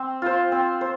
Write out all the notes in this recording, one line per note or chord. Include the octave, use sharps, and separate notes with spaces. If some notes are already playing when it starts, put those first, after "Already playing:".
Already playing: C4 C5
F4 C5
C4
C5